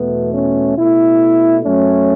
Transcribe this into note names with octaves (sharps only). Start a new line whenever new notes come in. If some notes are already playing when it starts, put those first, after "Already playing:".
Already playing: E2 B2 A3 B3
C#4
B2 A3 E4
F#2 F#3 A3 C#4